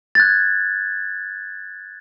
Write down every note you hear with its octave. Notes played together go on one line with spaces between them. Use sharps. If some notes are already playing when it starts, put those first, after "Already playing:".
F#6 G#6 A6